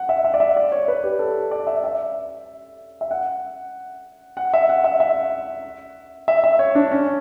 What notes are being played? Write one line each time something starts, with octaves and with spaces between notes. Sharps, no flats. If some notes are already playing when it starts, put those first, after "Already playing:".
Already playing: F#5
E5
E5
D5
E5
D5
C#5
B4
G4
A4
D5
E5
E5
E5
F#5
F#5
E5
F#5
E5
E5
E5
E5
C#5
D4
C#4